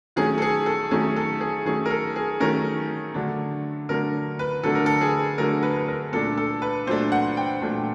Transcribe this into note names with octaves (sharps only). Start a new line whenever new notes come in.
D#3 F#3 A3 C#4 G#4
A4
G#4
A4
D#3 F#3 A3 C#4 G#4
A4
G#4
D#3 F#3 A3 C#4 G#4
A#4
A4
G#4
D#3 F#3 A3 C#4 A#4
D3 F#3 A3 D4
D3 F#3 A3 D4 A#4
B4
D3 F#3 A3 D4 A4
A#4
A4
G#4
D3 F#3 A3 D4 A#4
B4
B4
A#4
A#2 F#3 A3 D4 A4
A4
B4
A#2 F#3 A3 D4 C5
F#5
G5
A#2 F#3 A3 D4